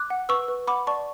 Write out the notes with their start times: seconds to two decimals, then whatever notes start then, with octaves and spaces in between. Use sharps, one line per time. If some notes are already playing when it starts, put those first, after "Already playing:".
Already playing: D6 F#6
0.10 F#5
0.29 B4 C#6 E6
0.48 B4
0.67 F#5 B5 D6
0.87 D5 A5 C#6